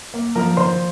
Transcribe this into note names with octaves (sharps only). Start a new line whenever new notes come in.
A#3
F3 A#4 A#5
D#3 C5 C6